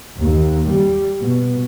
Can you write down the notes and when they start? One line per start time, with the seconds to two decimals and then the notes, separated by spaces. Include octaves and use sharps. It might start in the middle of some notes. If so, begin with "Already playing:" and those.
0.19 D#2
0.69 G3
1.20 B2